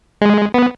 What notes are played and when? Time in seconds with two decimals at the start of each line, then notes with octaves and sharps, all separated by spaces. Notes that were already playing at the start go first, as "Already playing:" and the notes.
0.21 G#3
0.54 B3